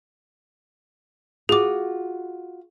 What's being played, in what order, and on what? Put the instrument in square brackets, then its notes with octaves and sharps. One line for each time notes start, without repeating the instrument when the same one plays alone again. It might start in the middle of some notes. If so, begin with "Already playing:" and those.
[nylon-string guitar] F4 F#4 [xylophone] G#4 D6